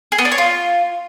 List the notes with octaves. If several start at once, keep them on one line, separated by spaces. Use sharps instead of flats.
G#4
B3
D4
C#5
F4